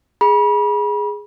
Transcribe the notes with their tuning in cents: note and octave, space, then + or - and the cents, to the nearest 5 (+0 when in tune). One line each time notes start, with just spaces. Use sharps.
G#4 +0 B5 -35